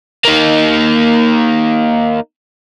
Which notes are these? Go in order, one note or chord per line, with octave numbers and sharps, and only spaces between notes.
A#3 D#4